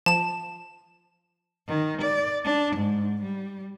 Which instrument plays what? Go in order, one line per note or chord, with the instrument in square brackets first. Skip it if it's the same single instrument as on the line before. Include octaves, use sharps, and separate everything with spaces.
[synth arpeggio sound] F3 [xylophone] A5 E7
[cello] D#3
D5
D4
G#2
G3